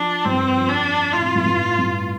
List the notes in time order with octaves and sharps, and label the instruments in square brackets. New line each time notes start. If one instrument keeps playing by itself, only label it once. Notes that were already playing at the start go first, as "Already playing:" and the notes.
Already playing: [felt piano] F3 [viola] D4
[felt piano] G2 [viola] C4
[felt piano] F2
F2
[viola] D4
[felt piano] A2 [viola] F4
[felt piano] C3
A2
G2
G2
A2
G2